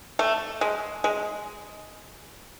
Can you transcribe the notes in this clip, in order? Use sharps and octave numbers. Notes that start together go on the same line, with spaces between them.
A3
G#3
G#3